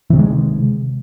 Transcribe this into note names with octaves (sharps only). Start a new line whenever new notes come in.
C3 D#3 E3 G#3